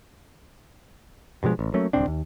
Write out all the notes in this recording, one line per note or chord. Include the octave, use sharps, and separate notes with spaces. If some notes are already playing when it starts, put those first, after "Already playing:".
G2 B2 F3 G#3
A1
F#3 A3 A#3 C#4
D1 C2 C4 D4
D#2